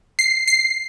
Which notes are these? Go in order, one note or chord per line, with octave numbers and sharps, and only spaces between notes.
C7
C7